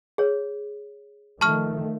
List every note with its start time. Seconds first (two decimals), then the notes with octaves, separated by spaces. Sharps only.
0.18 G#4 C#5
1.41 D#3 F3 A3 A5 C#6 F6